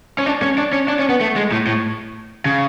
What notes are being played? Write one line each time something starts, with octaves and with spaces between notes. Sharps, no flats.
C#4
D4
C#4
D4
C#4
D4
C#4
B3
A3
G#3
A2
A2
C#3